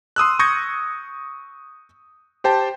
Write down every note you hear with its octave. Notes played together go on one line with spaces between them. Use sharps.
C6 D#6 E6 F#6
C#6 D#6 G6 G#6 A#6 C#7
G4 C5 G5 A5